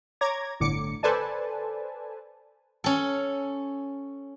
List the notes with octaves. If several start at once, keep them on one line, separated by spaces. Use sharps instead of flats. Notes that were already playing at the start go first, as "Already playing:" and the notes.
C#5 A#5 D6 G#6 A#6
G1 A2 D3 D6 C#7
A4 B4 C5 D5 G#5 A5
C#4 A4